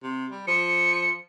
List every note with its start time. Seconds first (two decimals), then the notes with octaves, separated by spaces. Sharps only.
0.03 C3
0.31 G3
0.47 F3 C#7